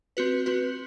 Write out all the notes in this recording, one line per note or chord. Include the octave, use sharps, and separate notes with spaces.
C4 F#4 B4
C4 F#4 B4